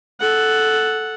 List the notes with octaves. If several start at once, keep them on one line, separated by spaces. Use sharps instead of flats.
A4 F#5